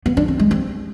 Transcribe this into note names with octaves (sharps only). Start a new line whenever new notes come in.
B3
D4
C4
G#3
C4